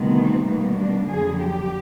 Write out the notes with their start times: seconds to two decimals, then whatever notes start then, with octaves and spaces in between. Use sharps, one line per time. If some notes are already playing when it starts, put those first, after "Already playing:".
Already playing: D2 C3 D#3 G3 B3
0.16 C4
0.47 B2 G3 A#3 B3
0.77 D4
1.08 F2 D3 F#3 G#4
1.39 G4